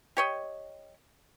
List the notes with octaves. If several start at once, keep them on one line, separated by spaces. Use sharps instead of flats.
G4 C#5 D#5